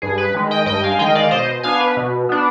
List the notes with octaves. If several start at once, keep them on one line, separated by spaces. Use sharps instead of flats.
G2 G#4
B4
D#3 G#3
D#5 G5
G2 D#5 G5
F5 G#5
D#3 G#3 D#5 G5
D5 F5
B2 C5 D#5
B3 D4 F5 G#5
B4
B2
B3 D4